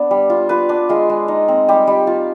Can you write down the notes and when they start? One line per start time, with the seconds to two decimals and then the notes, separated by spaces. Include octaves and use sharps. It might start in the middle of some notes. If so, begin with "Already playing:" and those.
Already playing: B3 D4 D5
0.11 G3
0.30 F4
0.49 F4 B4
0.69 D4
0.89 G#3 F4
1.10 G#3
1.28 D#4
1.48 C4
1.68 G3 G4
1.87 G3
2.07 F4